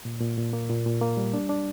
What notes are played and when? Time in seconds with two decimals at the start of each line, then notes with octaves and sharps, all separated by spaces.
0.05 A#2
0.21 A#2
0.38 A#2
0.53 A#3
0.70 A#2
0.86 A#2
1.01 A#3
1.17 G3
1.34 D4
1.49 D4